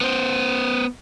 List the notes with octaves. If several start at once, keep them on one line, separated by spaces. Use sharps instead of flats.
B3 C5